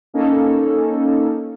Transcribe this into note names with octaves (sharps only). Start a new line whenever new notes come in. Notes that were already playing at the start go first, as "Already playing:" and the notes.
A#3 C#4 D#4 A4